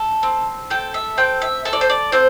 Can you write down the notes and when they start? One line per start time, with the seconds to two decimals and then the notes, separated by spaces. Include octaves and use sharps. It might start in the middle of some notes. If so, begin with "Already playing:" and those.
Already playing: A4
0.23 C4
0.70 A4 G5
0.94 E5
1.18 C4 G5
1.42 E5
1.65 A4 E5
1.73 D5
1.81 C5
1.90 D5
2.12 C4 C5